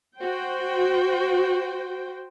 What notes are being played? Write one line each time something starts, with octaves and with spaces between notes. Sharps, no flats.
F#4 C5 G5